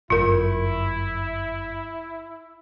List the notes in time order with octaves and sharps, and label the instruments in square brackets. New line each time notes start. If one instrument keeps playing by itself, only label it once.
[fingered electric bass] G1 F#2 [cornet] E4 [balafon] F4 A#4